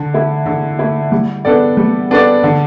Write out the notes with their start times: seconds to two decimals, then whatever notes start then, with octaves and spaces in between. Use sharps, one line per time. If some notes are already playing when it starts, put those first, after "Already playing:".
Already playing: D3
0.14 A3 E4
0.46 D3
0.79 A3 E4
1.12 G3
1.45 B3 D4 A4 D5
1.77 G3
2.11 B3 D4 A4 D5
2.44 D3